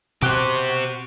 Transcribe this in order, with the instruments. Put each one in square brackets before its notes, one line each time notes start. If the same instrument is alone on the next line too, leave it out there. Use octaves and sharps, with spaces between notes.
[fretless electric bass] B2 C4 [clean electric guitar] F#4 [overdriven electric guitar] G4 C5